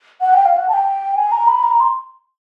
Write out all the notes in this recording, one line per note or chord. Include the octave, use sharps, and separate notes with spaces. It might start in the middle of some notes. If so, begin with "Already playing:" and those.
F#5
G5
F5
F#5
A5
G5
G#5
A#5
B5
A#5
C6